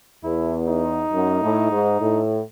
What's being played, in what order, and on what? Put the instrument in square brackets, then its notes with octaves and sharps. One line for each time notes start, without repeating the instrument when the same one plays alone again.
[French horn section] E2 [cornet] E4
[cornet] D#4
[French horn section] F#2
A2
G#2
A2